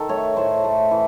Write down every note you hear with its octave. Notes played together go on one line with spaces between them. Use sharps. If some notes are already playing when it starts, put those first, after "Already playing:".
Already playing: D#3 A4
A3 C#5
A2 C5
A3
E3